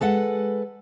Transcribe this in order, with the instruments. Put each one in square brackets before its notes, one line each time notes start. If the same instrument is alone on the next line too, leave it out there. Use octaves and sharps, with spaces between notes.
[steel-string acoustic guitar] G#3 A4 B4 F#5